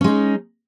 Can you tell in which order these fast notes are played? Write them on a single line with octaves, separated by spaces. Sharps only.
C#4 G#3 D#4